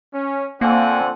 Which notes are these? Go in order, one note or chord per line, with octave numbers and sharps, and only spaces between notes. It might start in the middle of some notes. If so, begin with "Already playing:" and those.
C#4
F2 D3 A#3 C4 D5 F#5 G#5